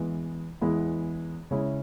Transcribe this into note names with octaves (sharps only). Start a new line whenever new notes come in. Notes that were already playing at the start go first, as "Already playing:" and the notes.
Already playing: E2 E3 G#3 B3 E4
E2 E3 G#3 B3 E4
C#3 G#3 C#4 E4